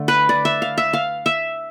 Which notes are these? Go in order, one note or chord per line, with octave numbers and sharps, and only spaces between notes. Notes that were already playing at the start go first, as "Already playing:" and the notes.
Already playing: D3 A3
B4
D5
E5
F5
E5
F5
E5